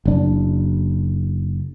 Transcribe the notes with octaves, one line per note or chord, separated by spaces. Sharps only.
F#1 D4